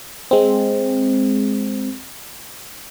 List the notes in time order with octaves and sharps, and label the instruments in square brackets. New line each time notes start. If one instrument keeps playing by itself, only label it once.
[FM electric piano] G#3 C4